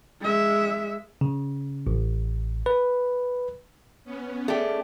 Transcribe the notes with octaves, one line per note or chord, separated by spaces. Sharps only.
G#3 E5
C#3
A1
B4
B3 C#4
A3 G4 G#4 D5